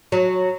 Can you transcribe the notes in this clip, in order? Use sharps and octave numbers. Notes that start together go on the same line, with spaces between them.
F#3